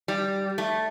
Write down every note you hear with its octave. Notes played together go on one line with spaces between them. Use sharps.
G3
A3